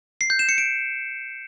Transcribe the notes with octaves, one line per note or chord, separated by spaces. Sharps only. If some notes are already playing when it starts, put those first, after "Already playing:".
C7
G6
E7
C#7
D7